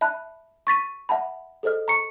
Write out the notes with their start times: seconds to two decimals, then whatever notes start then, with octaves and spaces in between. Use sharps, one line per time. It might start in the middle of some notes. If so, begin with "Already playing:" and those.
0.01 E5 A5 B5 F#6
0.67 C#6 A6 B6 D#7
1.09 E5 F#5 A5 B5
1.63 G#4 A4 C5 D#5 F6
1.88 A#5 C#6 C#7